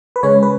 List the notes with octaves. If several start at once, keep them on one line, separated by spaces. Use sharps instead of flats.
B4
C#3 G#3 C#4 C#5
B4